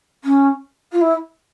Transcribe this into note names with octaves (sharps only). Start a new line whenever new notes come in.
C#4
F4
E4